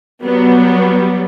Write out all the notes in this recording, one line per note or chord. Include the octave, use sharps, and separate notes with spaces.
F#3 G3 B3